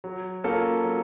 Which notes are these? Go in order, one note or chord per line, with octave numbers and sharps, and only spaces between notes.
F#3
A#3 C#4 F4 A4
F#3